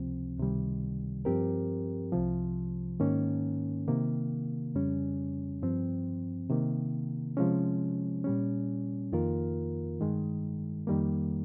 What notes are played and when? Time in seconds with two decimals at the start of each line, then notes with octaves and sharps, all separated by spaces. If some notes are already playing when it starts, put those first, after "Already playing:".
Already playing: C#2 C3 F3 C4
0.38 C#2 C3 D#3 G3
1.25 G2 F3 C4 G4 A#4
2.12 C2 C3 F3
3.00 G#2 D#3 A#3 C#4
3.88 C3 D#3 A#3
4.75 F2 C#3 G3 C#4
5.62 G2 F3 C4
6.50 C3 D#3 A#3
7.37 C3 F3 G#3 C#4
8.24 A#2 G3 C#4
9.12 F2 D#3 A#3 F4 A#4
10.00 G2 D#3 G#3
10.87 F2 D#3 G3 A#3